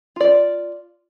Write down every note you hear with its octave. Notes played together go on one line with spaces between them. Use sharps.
F4 D5